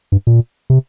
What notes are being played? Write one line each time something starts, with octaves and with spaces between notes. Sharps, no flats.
G2
A#2
C3